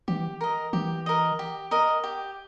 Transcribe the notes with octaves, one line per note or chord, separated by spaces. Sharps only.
E3 G4
A#4 D#5
E3 G4
A#4 D#5
G4
A#4 D#5
G4